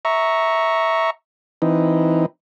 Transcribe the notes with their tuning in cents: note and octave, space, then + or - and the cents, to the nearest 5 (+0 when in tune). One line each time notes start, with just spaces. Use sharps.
E5 -15 A#5 +0 C#6 +0
E3 +0 C4 -15 D#4 +0